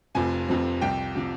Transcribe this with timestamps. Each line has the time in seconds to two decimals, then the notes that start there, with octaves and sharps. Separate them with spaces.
0.15 F1 F2 C3 F3 C4 G#5
0.48 F1 F2 C3 F3 C4
0.81 C2 C3 F3 G5
1.16 C3 F3